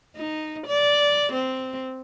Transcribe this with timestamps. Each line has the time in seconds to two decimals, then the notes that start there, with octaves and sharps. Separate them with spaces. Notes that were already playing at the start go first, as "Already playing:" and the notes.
0.16 D#4
0.67 D5
1.33 C4